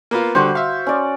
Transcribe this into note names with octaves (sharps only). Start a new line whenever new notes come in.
A#3 B3 F4
D3 G3 F#4 C5
E5 F5
C#4 D5